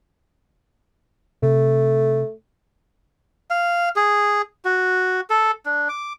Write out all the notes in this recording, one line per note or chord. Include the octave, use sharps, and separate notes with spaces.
C3 A3
F5
G#4
F#4
A4
D4
D6